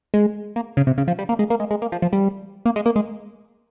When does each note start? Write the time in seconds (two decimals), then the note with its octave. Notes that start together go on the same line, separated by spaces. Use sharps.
0.14 G#3
0.56 A#3
0.77 C#3
0.87 C3
0.98 C#3
1.08 F3
1.19 G3
1.29 A#3
1.39 G#3
1.50 A#3
1.60 G#3
1.71 G#3
1.82 A#3
1.92 F3
2.02 F3
2.13 G3
2.66 A#3
2.76 G#3
2.86 A#3
2.96 G#3